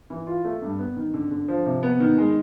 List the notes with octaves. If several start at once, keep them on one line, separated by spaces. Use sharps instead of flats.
E3
F4
A3
G2
B3
D#3
D3
D3
F3
C3
B3
D#3
G#3